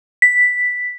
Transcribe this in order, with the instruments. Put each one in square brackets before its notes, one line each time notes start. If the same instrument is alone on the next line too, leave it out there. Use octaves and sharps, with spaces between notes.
[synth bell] B6